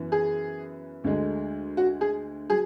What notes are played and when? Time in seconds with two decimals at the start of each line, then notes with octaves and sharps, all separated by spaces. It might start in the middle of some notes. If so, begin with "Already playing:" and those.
Already playing: F#2 E3 B3
0.12 G#4
1.04 D2 D3 G#3
1.77 F#4
2.01 G#4
2.50 F#3 G#4